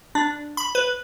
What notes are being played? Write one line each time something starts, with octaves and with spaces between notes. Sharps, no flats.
D4
B5
B4